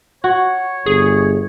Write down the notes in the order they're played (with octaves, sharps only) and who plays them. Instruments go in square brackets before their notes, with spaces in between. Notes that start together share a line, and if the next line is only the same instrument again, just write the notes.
[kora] F#4 [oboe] C#5
[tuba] G1 [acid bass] G#4